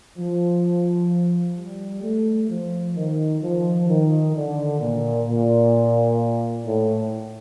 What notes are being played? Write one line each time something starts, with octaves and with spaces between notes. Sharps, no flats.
F3
G3
A3
F3
D#3
F3
D#3
D3
A#2
A#2
A2